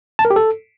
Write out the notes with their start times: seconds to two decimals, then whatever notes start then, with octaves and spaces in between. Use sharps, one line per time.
0.19 A5
0.25 A#4
0.30 G4
0.36 A4